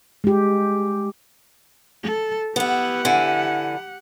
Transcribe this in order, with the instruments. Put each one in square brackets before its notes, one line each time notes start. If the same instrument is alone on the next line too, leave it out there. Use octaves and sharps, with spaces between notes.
[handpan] G#3 G4
[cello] A4
[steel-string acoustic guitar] B3 E4 [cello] G4 F#5
[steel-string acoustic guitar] D3 E4 G#5